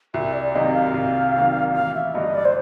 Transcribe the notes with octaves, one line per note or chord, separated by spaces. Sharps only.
C2 E5
D5
C3 D#3 F#3 A#3 D#5
F5
C2
C3 D#3 F#3 A#3
A1 F5
E5
G2 D3 G3 D#5
D5
C5